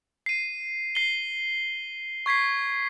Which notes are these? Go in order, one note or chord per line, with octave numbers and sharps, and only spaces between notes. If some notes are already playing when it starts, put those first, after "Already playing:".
C7 D#7
C7 G7
C#6 G#6 B6 C7